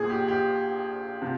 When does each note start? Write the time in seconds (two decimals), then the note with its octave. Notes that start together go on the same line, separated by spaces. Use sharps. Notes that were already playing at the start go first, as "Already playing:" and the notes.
Already playing: A#1 A#2 F3 G#4
0.10 G4
0.28 G4
1.22 C3 F3